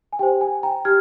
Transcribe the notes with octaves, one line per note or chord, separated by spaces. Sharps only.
G#5
G4 C5 G5
G#5
G5 A#5
G4 F6 G#6